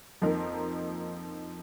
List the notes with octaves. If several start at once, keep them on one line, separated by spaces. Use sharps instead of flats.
F2 F3 A#3 D#4 A#4